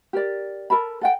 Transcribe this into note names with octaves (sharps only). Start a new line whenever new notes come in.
G4 A#4 D5
A4 A#4 A5 B5
A4 F#5 G5